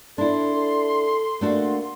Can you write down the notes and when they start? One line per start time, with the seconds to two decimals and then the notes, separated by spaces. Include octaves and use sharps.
0.18 D4 E4 A4 C6
0.55 A4
1.41 A3 A#3 D4 F#4